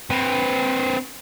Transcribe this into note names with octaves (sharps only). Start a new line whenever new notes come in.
C4 B4